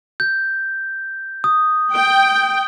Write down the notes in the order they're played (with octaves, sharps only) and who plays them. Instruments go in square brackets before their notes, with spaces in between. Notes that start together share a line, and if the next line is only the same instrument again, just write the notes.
[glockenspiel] G6
D#6
[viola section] G5